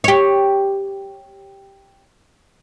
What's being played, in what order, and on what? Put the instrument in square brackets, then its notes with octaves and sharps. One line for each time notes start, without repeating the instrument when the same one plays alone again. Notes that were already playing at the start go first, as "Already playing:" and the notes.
[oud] G4 C#5